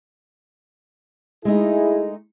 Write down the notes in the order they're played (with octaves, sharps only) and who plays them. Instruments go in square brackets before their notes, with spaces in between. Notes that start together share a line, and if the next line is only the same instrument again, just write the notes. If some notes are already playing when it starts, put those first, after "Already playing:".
[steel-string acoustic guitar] G#3 A3 D#4 [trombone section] E4 G#4